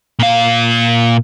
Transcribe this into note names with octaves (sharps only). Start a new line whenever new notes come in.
A#2 F5